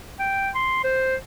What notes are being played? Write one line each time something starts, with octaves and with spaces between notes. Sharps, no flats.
G5
C6
C5